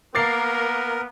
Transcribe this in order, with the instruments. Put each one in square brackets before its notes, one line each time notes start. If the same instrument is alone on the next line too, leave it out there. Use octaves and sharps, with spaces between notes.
[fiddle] A#3 [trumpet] B3 [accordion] A#4 [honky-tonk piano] D6 A6 C7